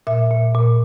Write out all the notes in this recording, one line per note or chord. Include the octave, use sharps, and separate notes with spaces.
A#2 E5
A#2
A#2